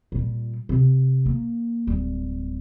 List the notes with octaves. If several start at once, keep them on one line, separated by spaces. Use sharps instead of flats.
A#2 G3
C3
A#3
D1 G3